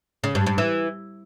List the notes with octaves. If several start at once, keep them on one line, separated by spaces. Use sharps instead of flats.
C#3
G2
G2
E3